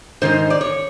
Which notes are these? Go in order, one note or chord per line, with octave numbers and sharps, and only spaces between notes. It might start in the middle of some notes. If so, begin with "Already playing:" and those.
G#2 D#3 D#4 C5
D5
C#5